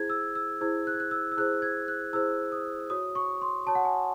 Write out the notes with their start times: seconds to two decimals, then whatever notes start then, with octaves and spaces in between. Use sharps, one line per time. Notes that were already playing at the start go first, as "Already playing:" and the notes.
Already playing: E4 G#4 C5 G#6
0.10 E6
0.35 E6
0.61 E4 G#4 C5 G#6
0.87 F#6
0.94 G#6
1.00 F#6
1.11 E6
1.32 E6
1.37 E4 G#4 C5 F#6
1.62 G#6
1.88 F#6
2.13 E4 G#4 C5 E6
2.52 D#6
2.90 F#4 C#5 D#6
3.15 C#6
3.41 C6
3.66 F#4 C#5 A5
3.75 F#5
3.85 G#5